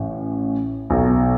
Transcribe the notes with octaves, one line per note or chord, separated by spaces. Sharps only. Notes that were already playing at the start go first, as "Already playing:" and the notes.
Already playing: A1 A2
B1 B2